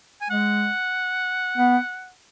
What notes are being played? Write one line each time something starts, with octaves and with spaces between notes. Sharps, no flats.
G#5
G#3 F#5
B3